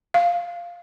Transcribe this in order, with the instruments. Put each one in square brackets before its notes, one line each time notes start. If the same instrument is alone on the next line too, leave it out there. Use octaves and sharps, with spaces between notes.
[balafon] F5